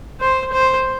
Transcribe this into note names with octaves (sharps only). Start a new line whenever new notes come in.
C5
C5